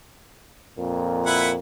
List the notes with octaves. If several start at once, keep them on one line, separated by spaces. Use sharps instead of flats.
F2 A#2 A#4
E4 B4 F#5